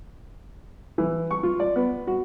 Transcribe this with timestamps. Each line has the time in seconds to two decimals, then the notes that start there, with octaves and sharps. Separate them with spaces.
0.98 E3
1.31 C#6
1.43 F4
1.60 D5
1.76 B3
2.07 F#4